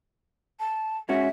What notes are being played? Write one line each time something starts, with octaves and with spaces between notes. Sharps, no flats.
A5
G#2 C#4 F#4 E5